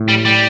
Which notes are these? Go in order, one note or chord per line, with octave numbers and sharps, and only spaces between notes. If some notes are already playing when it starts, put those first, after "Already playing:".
Already playing: A2
G3
G3